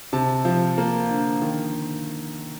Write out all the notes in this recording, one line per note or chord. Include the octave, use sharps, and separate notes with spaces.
C3 A5
F3
A#3
D3
D#3